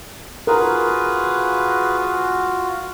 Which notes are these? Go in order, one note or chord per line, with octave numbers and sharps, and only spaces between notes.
F4 F#4 G#4 A#4 B4 F5